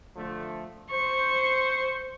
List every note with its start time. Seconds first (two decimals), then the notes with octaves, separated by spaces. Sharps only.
0.16 D3 F3 A3
0.91 C5 C#6